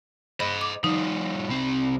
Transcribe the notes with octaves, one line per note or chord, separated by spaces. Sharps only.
C5 D#5 B5
D6
F3 G3 D#4
C2 C4